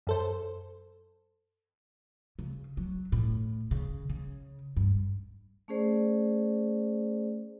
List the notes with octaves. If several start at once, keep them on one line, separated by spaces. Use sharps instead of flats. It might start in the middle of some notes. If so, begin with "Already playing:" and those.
F#2 A4 C5
C#3
F#3
A2
C#3
C#3
G2
A3 C#4 G#4 C5 D5